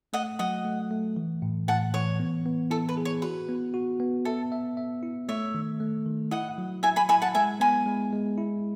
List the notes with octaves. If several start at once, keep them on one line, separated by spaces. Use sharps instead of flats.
A3 D#5 F#5
F#3 D#5 F#5
A3
A3
E3
A2
A2 F#5 A5
E3 C#5
B3
B3
E4 A4
B4
G#4
C#5
F#4 B4
B3
F#4
B3
A4 E5
E5
E5
E4
A3 C#5 E5
D#3
A3
D#3
E4 D#5 F#5
F#3
E4 E5 G#5
G#5 B5
E4 G#5 B5
F#5 A5
G#3 E5 G#5
B3 G#5 B5
G#3
G#3
E4